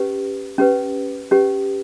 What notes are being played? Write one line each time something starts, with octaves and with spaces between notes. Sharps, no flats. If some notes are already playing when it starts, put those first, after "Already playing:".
Already playing: C#4 G4 B4
C#4 G4 B4
C#4 G4 B4